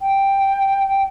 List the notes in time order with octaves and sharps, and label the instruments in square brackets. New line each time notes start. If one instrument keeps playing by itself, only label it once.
[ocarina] G5